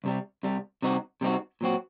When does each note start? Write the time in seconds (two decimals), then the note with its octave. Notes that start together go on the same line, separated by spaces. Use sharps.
0.04 C2 C3 G3
0.43 C2 C3 G3
0.82 C3 G3 C4 D#4 F#4
1.21 C3 G3 C4 D#4 F#4
1.61 A#2 F#3 C4 F#4